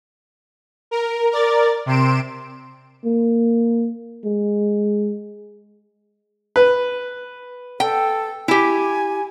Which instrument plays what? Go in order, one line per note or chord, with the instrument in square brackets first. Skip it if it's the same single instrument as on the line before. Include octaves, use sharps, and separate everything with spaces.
[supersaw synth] A#4
A#4 D5 A6
C3 C6 D7 E7
[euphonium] A#3
G#3
[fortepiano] B4
[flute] A4 [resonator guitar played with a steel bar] G5
[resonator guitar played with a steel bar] E4 G4 [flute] G#5